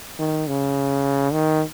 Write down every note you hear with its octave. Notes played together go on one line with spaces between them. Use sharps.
D#3
C#3
D#3